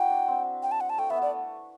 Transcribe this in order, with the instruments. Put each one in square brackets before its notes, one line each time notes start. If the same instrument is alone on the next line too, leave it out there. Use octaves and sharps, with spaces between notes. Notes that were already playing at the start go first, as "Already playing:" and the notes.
Already playing: [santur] E4 F#4 [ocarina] G5
[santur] D4
C4
[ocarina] G5
A5
F#5
A5
[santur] A3 [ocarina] G5
[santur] B3 [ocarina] E5
[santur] A3 [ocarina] D5